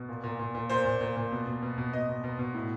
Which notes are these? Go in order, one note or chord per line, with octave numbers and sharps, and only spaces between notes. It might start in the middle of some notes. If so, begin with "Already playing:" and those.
Already playing: B2
A#2
A#2
A#2
A#2
A#2 C5
A#2
A#2
A#2
B2
B2
B2
B2
B2 D#5
B2
B2
B2
A2